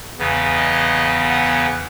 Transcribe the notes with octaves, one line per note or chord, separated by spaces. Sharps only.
E2 C#3 E3 B3
D#5
F#5